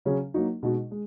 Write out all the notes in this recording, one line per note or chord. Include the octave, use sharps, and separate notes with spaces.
C#3 F#3 C#4 G#4
F#3 A#3 D#4 F#4
B2 G#3 D#4 F#4
G#3